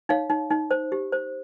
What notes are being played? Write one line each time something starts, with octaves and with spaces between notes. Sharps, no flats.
D#4 C#5 F5
D#4
D#4
C5
G4
C5